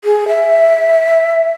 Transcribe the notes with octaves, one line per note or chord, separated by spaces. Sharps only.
G#4
E5